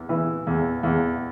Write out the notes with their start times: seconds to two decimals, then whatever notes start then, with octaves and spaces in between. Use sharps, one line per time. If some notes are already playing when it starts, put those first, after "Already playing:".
Already playing: E2
0.09 E3
0.47 E2
0.83 E2